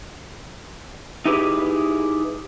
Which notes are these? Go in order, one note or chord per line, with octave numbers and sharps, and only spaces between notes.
D#4 E4 G4 G#4 B4